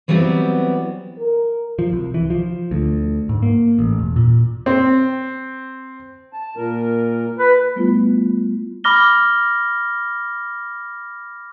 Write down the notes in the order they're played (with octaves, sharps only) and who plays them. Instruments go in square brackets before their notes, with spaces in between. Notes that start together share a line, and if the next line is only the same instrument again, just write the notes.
[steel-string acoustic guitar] E3 F#3 G3 B3 C4 E4
[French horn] A#4
[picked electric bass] F3
C2
E3
F3
D2
G#2
A#3
A1
E1
A#2
[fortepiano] C4
[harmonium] A5
A#2 A#4
[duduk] B4
[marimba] G3 A3 B3 E4 F4
[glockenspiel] B5 D6 F6 A#6 G7